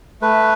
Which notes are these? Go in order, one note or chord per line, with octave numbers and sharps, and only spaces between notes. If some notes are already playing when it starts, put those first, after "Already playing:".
A3 B4